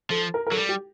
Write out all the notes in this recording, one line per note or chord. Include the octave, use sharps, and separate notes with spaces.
F3 A4
A#4
A#4
F#3 A4
G3
G4